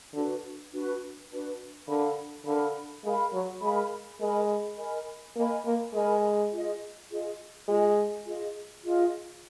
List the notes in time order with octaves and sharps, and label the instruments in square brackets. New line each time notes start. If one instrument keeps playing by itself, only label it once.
[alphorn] D3 [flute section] D4 F#4 B4
[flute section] D4 F#4 B4
D4 F#4 B4
[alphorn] D3 [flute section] A#4 F5 B5
[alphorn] D3 [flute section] A#4 F5 B5
[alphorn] G#3 [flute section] A#4 F5 B5
[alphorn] F#3
[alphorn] G#3 [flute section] A#4 F5 B5
[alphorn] G#3 [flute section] A#4 D#5 G#5 B5
[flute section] A#4 D#5 G#5 B5
[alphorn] A#3 [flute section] A#4 D#5 G#5 B5
[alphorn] A#3
[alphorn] G#3 [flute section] A#4 D#5 G#5 B5
[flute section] F4 G#4 D#5
F4 G#4 D#5
[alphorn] G#3 [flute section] F4 G#4 D#5
[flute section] F4 G#4 D#5
F4 G#4 D#5